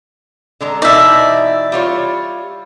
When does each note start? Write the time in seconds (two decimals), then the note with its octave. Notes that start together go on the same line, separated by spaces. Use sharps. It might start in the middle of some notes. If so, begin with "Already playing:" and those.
0.61 D3 G#3 A#5
0.82 B2 E3 D#4 D5 E5
1.72 G3 F4 C#5